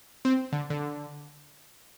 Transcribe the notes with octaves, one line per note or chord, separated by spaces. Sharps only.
C4
D3
D3